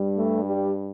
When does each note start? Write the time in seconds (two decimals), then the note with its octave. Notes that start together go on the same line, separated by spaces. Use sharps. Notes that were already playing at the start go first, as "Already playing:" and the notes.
Already playing: G2 G3
0.15 A3
0.45 G3